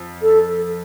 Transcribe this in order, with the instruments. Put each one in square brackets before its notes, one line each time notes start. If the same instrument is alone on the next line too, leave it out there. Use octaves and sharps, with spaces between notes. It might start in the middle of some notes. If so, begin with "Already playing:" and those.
Already playing: [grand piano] F2
[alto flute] A4